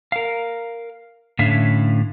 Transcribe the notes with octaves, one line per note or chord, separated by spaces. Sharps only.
A#4 F5
A2 D3 C#4 E5 F5